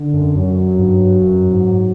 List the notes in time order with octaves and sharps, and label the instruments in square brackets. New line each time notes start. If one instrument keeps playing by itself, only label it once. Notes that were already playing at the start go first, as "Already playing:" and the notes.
Already playing: [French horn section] D3
[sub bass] F#2
[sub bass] F#2 [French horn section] F#3
[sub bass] G2
F#2
G#2